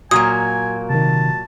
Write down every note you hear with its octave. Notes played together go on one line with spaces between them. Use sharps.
A#2 F#3 A#3 F#4 G#5 D#6
C3 D#3 A5